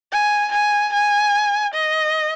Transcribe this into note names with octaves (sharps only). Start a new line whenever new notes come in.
G#5
G#5
G#5
D#5